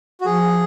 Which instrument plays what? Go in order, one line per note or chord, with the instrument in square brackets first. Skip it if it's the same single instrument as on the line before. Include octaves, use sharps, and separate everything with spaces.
[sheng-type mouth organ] F#4
[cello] F3 [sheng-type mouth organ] G#4